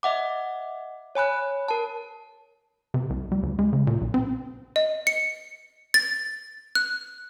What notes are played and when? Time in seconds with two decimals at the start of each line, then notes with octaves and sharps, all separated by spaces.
0.03 D#5 E5 F#5 D6
1.15 C#5 G#5 B5 F#6
1.68 A#4 A5
2.94 C3
3.10 C2
3.32 G3
3.43 D2
3.59 G#3
3.73 C#3
3.87 A#2
4.01 B1
4.14 C4
4.76 D#5
5.07 C#7
5.94 A6
6.75 F#6